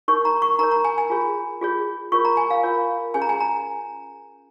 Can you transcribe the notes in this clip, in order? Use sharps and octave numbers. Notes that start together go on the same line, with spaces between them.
D#4 A#4 C#5 C#6
A#5
C#6
D#4 A#4 C#5 A#5
A#5
G#5
G#5
F4 G#4 C#5
F4 G#4 C#5
F4 A#4 C#5 C#6
A#5
G#5
F5
F4 A#4 C#5
C#4 G#4 C#5 G#5
A#5
G#5
A#5